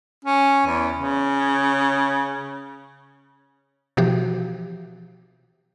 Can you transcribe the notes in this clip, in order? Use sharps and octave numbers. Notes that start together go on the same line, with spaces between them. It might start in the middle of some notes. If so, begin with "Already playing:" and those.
C#4
E2
C#3
B2 E3 F3 F#4 G4